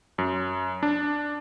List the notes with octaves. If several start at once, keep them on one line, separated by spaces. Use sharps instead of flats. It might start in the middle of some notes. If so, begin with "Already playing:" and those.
F#2
D4